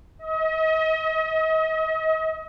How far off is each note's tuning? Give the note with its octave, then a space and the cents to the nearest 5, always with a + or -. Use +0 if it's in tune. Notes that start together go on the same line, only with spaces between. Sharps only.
D#5 +40